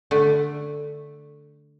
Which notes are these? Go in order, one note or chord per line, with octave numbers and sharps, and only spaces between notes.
D3 A3